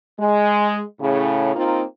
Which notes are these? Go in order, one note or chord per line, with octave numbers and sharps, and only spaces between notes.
G#3
A2 C#3
A#3 C4 D#4 F4